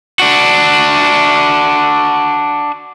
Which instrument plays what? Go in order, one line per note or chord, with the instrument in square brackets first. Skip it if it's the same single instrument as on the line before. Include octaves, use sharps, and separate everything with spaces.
[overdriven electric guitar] D4 F#4